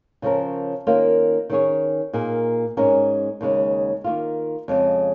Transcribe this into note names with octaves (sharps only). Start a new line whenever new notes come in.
C#3 F3 C#4 A#4
D#3 A#3 C#4 F4
D#3 C#4 G#4 C#5
A#2 A#3 D#4 G#4
G#2 G#3 C#4 A#4
D#2 C#3 G#3
D#3 A#3 F4
F2 C#3 G#3